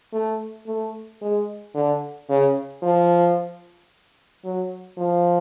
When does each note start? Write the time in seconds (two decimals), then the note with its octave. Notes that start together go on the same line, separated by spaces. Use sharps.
0.13 A3
0.67 A3
1.22 G#3
1.75 D3
2.29 C#3
2.83 F3
4.45 F#3
4.98 F3